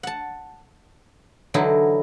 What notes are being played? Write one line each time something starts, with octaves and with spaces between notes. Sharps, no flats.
F#5 A5
D3 E3 F#3 D#4 E4